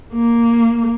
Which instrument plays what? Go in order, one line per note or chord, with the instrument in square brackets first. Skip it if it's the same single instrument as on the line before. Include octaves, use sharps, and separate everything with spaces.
[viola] A#3